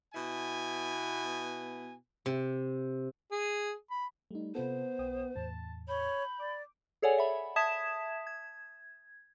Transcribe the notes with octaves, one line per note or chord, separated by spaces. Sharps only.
B2 B3 E4 G#5
C3
G#4
B5
G3 A3 D#4
C3 B3 F4 A4 C5
B1 G5 D#6
E2 A2 A5
C#5 B5 G6
D5 D6
G#4 A4 C#5 D5 F#5 G#5
E5 B5
E5 A5 D#6 G#6 B6 E7
G#6